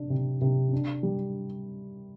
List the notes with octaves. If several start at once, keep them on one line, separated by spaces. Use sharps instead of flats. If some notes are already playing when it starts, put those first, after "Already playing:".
Already playing: C3 D4
C3
C3
D4
G3